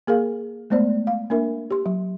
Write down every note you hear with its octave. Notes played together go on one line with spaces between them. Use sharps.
A#3 G#4 A#4 F5
G#3 A3 B3 C5 D5
F5
A#3 D4 A#4 E5
G4 C6
F#3